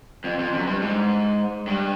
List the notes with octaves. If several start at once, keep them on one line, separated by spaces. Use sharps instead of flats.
F2
F2
F#2
G2
G#2
G2